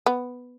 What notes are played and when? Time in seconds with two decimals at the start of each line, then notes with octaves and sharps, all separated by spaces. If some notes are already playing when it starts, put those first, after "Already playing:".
0.06 B3